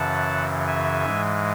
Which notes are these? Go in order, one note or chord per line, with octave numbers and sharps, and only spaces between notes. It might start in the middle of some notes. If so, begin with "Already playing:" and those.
Already playing: F#2 C#3 E3 F#5 A5
E5 G#5
G#2 E3 G#3